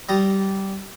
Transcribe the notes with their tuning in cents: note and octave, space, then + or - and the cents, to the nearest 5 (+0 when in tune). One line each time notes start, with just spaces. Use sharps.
G3 -15 A#5 -15 D#6 +0